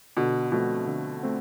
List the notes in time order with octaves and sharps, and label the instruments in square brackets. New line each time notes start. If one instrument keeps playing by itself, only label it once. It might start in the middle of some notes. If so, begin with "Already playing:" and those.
[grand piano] B2 [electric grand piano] D3
[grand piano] B2 [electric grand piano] F3 A3 C4
[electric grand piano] D3
A3 C4